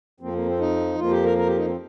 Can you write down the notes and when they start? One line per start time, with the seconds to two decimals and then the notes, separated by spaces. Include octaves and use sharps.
0.20 F2 F3 A#3 C4
0.33 A#3
0.46 C4
0.59 D#4
0.98 F2 F3 A#3 F4
1.11 G4
1.24 A#4
1.38 A#4
1.46 G4
1.56 D#4
1.66 C4